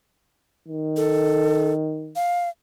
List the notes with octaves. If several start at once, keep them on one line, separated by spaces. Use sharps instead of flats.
D#3
A4
F5